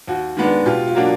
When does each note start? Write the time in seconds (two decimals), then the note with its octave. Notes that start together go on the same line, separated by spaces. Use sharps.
0.07 D#2 F#4
0.37 D#3 G#3 B3 D4
0.66 B2 F4 G4
0.87 F4
0.95 F#3 A#3 D4 F#4